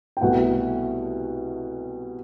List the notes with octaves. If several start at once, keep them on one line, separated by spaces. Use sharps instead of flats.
G5
C2 B2 A3 F#5